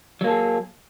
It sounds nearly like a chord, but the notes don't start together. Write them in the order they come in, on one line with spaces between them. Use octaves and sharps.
F#3 A#3 A4 G#4